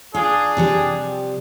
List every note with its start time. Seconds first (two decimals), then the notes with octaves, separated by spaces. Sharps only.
0.14 D4 F4 G#4
0.57 C3 F3 G3